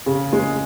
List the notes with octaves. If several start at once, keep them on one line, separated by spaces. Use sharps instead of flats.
C#3
G#3